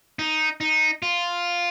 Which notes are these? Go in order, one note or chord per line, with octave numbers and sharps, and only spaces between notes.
D#4
D#4
F4